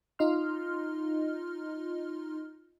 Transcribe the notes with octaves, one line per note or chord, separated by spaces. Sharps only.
D#4 F4 D#5 C6 F6